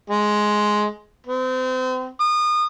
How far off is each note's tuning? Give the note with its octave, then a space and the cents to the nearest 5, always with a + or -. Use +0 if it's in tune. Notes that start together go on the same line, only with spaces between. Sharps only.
G#3 +10
C4 -35
D#6 -30